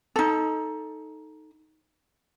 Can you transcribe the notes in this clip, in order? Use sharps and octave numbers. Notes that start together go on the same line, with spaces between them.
D#4 A4